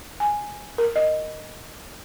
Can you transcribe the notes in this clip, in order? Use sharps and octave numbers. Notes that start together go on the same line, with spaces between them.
G#5
A#4
D#5